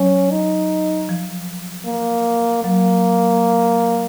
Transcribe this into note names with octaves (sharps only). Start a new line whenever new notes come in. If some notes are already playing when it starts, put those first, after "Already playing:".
Already playing: F#3 C#4
D#4
F3
A#3
F#3 A#3